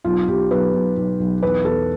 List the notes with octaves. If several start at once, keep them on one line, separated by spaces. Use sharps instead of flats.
B1 F4
B1 G4
B1 B4
B1
B1
B1
E2 B4
E2 A4